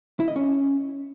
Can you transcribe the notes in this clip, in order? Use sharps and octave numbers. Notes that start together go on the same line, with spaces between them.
E4
D#5
C#4